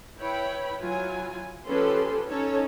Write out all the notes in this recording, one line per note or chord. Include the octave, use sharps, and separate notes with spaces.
E4 B4 C#5 G5 B5
F#3 E4 F4 G#5
F3 C#4 G4 A4 B4 C6
C#4 D#4 A4 C#5